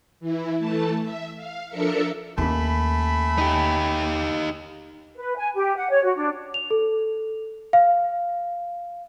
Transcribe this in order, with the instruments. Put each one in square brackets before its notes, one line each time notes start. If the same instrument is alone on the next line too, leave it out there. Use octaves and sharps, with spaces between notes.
[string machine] E3 E4
E3 A3 A5
E5
F5
F3 D4 A4 A#4 E5 C#7
[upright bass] D#2 C#4 [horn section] A3 G#5 B5
[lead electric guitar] D#4 G4
[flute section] B4
G#5
G4
F#5
C#5
F#4
D4
[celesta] F7
A4
F5